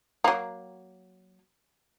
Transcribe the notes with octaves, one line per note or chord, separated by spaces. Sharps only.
F#3 A#3